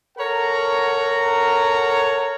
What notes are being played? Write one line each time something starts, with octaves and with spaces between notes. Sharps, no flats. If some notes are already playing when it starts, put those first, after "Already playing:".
A4 A#4 C#5 F#5 A#5